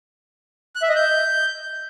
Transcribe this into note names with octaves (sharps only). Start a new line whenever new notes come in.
F#6
E5
D#5
G6